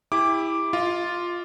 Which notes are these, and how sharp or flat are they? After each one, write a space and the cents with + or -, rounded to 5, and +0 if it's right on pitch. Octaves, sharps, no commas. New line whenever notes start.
E4 -5 G4 +35 D6 +0
F4 +0 D#5 +35